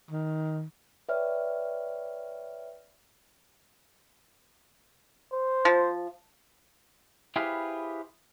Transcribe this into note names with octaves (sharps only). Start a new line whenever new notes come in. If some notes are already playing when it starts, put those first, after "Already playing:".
D#3
B4 C#5 D5 E5 G5 F6
C5
F3
E4 G4 G#4 B4 C5 F5